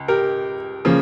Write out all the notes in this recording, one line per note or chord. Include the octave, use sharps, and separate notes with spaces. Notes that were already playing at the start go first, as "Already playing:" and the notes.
Already playing: C#2
G4 A#4
C#3 F3 A#3